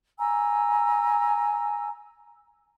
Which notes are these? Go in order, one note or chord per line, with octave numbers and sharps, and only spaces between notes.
G#5 A#5 E6